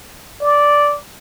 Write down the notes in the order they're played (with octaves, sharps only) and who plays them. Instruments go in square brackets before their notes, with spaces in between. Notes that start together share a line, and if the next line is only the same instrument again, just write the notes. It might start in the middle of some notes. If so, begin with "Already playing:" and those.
[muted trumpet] D5